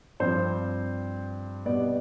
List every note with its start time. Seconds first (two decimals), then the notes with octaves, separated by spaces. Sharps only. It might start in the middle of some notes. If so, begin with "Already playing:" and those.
0.20 G2 F3 C4 C5
1.66 B2 G3 B3 D5